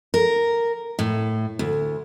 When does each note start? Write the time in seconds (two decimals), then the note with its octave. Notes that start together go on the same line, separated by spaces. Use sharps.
0.14 A#4
0.99 A2
1.59 D2